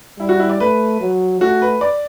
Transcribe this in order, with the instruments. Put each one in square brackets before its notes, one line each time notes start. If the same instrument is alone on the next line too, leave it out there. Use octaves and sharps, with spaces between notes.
[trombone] G3 [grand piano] E4
[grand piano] F#4
E4
D5
[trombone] A3 [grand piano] B4
[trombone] F#3
[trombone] A3 [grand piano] F#4
[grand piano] B4
D5